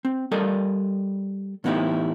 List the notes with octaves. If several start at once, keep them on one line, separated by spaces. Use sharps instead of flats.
C4
G3 A4 A#4 D5 D#5
A2 E3 B3 D#4 E4 G4